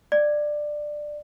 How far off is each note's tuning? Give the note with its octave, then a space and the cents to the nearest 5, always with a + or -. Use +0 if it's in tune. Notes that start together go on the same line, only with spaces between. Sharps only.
D5 +15